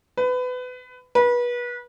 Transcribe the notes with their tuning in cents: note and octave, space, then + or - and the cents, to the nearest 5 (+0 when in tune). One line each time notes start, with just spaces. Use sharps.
B4 +25
B4 -30